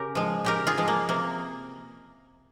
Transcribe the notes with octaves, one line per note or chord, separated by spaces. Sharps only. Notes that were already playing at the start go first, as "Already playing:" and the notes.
Already playing: C#3 G4 A#4
F3 G#3
C#3 G4 A#4
F4 G#4
F3 G#3
A#3
C3 A#3